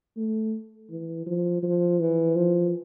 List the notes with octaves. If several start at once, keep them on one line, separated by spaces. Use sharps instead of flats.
A3
E3
F3
F3
E3
F3